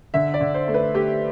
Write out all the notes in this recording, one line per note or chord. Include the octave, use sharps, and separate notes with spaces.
D3 E5
D5
D3
C5
A3
B4
A3 G4